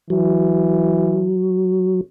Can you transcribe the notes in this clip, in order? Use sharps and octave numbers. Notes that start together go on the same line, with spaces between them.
E3 F#3